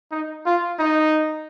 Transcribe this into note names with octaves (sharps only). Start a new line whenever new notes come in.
D#4
F4
D#4